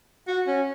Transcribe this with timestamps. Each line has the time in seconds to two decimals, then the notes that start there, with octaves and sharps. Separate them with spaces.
0.27 F#4
0.47 C#4